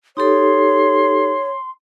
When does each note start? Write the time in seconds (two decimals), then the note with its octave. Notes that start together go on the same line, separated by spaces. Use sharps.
0.17 D#4 G4 A4 C#5 C6